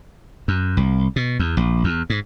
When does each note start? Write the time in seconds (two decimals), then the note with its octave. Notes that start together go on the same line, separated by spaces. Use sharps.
0.48 F#2
0.77 C2
1.16 B2
1.39 E2
1.57 A#1
1.84 E2
2.10 G#2